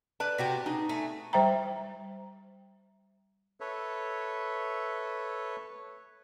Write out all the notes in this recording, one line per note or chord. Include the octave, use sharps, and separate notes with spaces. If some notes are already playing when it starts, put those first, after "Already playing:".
B4 D5 A5
C3 F#4 G4
D#4 G#4
A3 G#5
G3 C5 E5 G5 A#5
A4 B4 C#5 E5